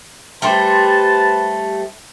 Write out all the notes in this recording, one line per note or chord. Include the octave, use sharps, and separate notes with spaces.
G3 A3 B4 C5 A5 C6